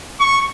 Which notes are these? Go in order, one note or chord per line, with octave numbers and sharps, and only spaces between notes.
C#6